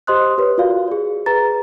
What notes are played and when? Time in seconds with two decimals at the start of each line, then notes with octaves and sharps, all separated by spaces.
0.07 G4 C5 D#5 C6 D#6 F#6
0.38 G4 B4 C#5
0.58 F4 F#4 A#4 D5 F5
0.88 G#4 D5
1.26 G#4 B4 A#5 A6